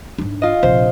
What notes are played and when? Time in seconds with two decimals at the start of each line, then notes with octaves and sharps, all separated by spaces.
0.18 G#2 D4
0.42 F4 D#5
0.63 A#1 C3 C5